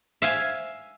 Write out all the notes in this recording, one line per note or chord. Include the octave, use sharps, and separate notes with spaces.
E5 F5 G#5